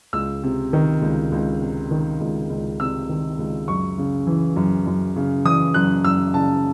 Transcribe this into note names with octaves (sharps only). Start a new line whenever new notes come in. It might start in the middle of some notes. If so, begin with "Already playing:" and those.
C#2 E6
C3
D#3
C#2
C#2
C3
D#3
C#2
C#2
C3 E6
D#3
C#2
F#2 C#6
C#3
E3
F#2
F#2
C#3
E3 D#6
F#2 F#6
F#2 E6
C#3 A5